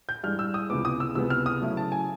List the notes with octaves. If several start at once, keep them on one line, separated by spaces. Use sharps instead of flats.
G6
G2 E3 G#3 F6
E6
D#6
C#2 C3 E3 G#3 B3 D6
D#6
E6
C#2 C3 E3 G#3 B3 E6
F6
D#6
C#3 F#3 A3 C#4 E4
A5
G#5